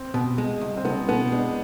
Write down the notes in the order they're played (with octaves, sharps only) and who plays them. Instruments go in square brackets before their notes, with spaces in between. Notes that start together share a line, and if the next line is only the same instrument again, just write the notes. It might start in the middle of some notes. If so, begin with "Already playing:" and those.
Already playing: [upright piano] C4
[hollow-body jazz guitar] B2
G#3
C2
[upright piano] C4
[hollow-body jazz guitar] C2 [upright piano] B3
[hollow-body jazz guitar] B2 [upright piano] B3
[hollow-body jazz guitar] G#3 [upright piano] D4